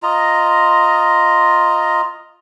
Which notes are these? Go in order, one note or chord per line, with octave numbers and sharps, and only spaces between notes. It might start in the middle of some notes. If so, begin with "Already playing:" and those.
F4 D#5 A#5